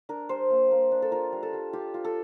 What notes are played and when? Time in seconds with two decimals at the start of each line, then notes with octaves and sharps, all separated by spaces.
0.09 D4 A#4
0.29 G3 C5
0.50 A#3
0.71 A#3
0.91 D4
1.02 A4
1.12 F4 A#4
1.32 G3
1.43 A4
1.53 G3
1.73 F4 G4
1.94 F4
2.05 A4